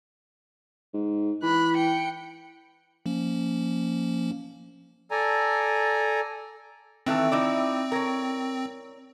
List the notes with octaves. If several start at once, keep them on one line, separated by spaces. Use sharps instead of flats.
G#2
E3 B5 F#6
G5 C#7
F3 A#3 C#4
A4 D5 G#5 A#5
D#3 E3 A3 C4
D#4 E4 D5
A#4 C#5